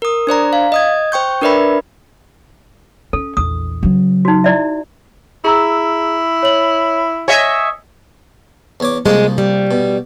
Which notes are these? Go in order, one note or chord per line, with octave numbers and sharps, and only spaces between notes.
A#4 D#6
D4 C5 D5 A#5
F5
D#5 D#6 G#6
C5 G5 C#6 G6
D4 A#4 B4 D5 E5 B5
C#4 A4
A#1 E2 D#6
C#3 F#3
D#4 F#4
E4 D5 E5
E4 G#4 A#5 E6
C#5 F#7
C#5 D#5 E5 G#5 G#6
E2 C#5 D6
C2 F3 G#3 A#3
G3
B2